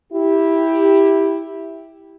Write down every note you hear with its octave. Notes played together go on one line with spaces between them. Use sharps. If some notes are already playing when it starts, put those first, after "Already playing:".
E4 G4